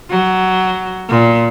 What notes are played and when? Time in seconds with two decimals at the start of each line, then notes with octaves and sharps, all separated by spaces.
0.10 F#3
1.09 A#2